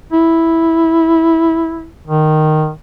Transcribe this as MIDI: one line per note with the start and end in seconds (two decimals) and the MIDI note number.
0.13 1.89 64
2.07 2.71 51